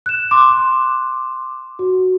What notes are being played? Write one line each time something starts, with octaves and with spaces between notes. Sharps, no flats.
F#6 E7
C6 D6
F#4